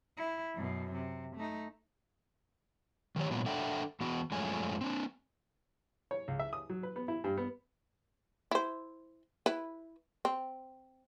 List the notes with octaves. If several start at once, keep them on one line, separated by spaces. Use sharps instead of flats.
E4
F#2 B2
C3
A3 D#4
D#3 F3 G4 C#5
A#2 F3 F#3 G#3 B3
D4 A4 E5 F#5 G5
E2 B3 F#4
F#2 F3 G#3 A3 C#4 G#5
C4 D4
C#5
C#2
E5
D#6
F#3
B4
B3
E4
G2
B3
E4 C5
E4 B4
C4